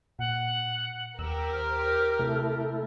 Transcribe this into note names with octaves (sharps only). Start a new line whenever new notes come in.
A#2 F#5
D#2 G4 A#4 E6
C5 F6
C3 A3 E4 A4